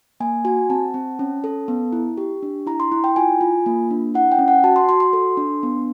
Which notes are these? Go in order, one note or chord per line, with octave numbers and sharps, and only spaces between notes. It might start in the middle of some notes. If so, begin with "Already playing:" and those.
A#3 G#5
F#4 G#5
C4 A5
C4
C#4
A4
B3
E4
G4
D4
E4 A#5
C6
E4
G5
F4 G#5
F4
A#3
D4
E4 F#5
G5
C#4
F#5
F#4 A5
C6
F#4 C6
C6
A4
D4
B3